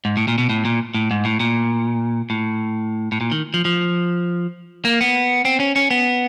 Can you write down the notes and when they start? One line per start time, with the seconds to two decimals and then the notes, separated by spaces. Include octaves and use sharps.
0.05 G#2
0.17 A2
0.28 A#2
0.38 B2
0.50 A2
0.65 A#2
0.95 A2
1.11 G#2
1.25 A2
1.40 A#2
2.30 A2
3.12 A2
3.21 A#2
3.32 D#3
3.54 F3
3.65 F3
4.85 A#3
5.01 B3
5.45 C4
5.60 C#4
5.76 C#4
5.91 B3